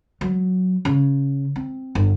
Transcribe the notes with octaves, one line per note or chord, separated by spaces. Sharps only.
F#3
C#3
C4
G1